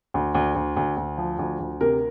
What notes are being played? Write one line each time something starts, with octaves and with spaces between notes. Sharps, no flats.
D2
D2
D2
D2
D2
F3
D2
D2
C3 A#4